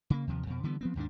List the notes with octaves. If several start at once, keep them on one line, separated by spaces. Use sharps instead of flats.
C#3 A#3
D#2 C3 F3
F2 B2
D3 E3 G3 B3
F3 B3 C4
D#2 G#2 D#3 D4